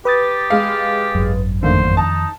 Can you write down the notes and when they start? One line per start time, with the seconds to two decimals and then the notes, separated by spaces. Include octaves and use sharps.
0.05 G4 B4 D#6 A6
0.50 G#3 F5
1.15 G#1 F#2
1.63 F2 D3 D#3 A3 A#3 C5
1.97 D#4 A5